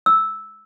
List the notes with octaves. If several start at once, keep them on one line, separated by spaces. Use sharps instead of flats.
E6